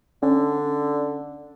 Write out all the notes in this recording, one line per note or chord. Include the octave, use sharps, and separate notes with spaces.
D3 C#4